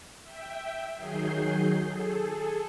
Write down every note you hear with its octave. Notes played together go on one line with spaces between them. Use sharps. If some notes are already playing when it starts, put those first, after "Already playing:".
E5 G5
D#3 F#3 G#4 G6 C7
G#4 A4